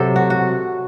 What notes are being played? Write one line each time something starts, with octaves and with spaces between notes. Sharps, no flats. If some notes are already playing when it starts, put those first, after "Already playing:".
Already playing: C3 F#3 A4
F#4
F#4